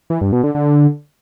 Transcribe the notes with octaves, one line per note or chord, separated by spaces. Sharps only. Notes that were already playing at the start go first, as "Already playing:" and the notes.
E3
G2
B2
D3
D3